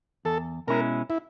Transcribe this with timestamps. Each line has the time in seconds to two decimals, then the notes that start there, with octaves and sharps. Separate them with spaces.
0.25 E2 A4
0.67 B2 G#3 C#4 E4 A#4
1.10 E4